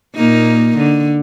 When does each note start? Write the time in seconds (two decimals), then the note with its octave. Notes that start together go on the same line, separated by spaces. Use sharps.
0.16 A#2 A#3 D#4
0.77 D3